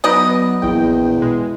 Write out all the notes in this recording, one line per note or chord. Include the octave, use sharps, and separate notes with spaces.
F#3 B3 D#4 D5 D#5
A#1 E2 G5
B2 G#3